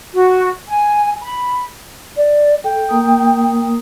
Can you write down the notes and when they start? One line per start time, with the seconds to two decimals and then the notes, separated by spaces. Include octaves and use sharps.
0.13 F#4
0.69 G#5
1.21 B5
2.17 D5
2.64 A4 G5
2.89 A#3 A#4 D#6